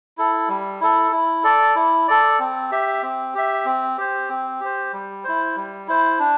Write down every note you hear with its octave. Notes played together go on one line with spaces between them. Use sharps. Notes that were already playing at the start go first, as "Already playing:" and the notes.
E4 A4
G3
E4 A4
E4
A4 D5
E4
A4 D5
C4
G4 E5
C4
G4 E5
C4
G4 C5
C4
G4 C5
G3
E4 C5
G3
E4 C5
D4